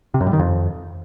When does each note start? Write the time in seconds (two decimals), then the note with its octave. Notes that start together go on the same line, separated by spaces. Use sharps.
0.14 C3
0.21 F#2
0.27 G2
0.33 D#3
0.39 F2